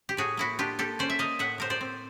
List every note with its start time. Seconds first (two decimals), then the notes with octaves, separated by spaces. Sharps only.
0.09 G4
0.17 A2 F#4 G#4
0.37 A#3 E4 F#4
0.59 D4 F4 G4
0.79 A#3 G4 A4
0.99 C#4 C5 D5
1.10 E5
1.19 A#3 D#5 F5
1.39 A2 E5 F#5
1.58 A2 A#4 C5
1.70 C5 D5
1.81 C4